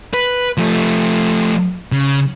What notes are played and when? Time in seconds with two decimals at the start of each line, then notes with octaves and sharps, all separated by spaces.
0.14 B4
0.58 F3 A3
1.92 C#3